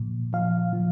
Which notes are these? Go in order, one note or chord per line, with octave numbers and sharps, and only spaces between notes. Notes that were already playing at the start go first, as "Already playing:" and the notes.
Already playing: A#2 F3
F3 F5
F3